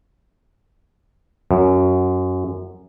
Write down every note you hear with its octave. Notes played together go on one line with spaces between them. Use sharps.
F#2